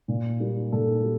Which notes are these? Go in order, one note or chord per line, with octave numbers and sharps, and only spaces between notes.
A#2
G3 A#3
A#2 A4
G3